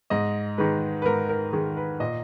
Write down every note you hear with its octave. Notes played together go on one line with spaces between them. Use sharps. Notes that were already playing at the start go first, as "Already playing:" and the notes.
G#2 D#5
D#3 G#3 B4
B4
G#2 A#4
A#4
D#3 G#3
B4
A#2 D#5